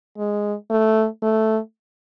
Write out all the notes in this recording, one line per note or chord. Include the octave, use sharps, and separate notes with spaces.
G#3
A3
A3